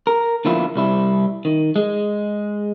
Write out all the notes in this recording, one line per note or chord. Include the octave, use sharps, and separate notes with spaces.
A#4
D3 F3 A#3 B3 E4 F4
C2 G3 E4
D#3
G#3